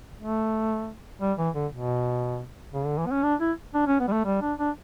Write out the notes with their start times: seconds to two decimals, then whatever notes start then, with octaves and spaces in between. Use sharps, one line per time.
0.21 A3
1.21 G3
1.38 E3
1.55 D3
1.72 B2
2.74 C#3
2.86 D3
2.98 E3
3.06 B3
3.11 C#4
3.23 D4
3.40 E4
3.74 D4
3.87 C#4
4.00 B3
4.08 G3
4.12 A3
4.25 G3
4.41 D4
4.59 D4